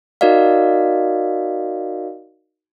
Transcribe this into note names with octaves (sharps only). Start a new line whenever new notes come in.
D#4 F#4 A#4 D5 D#5 F5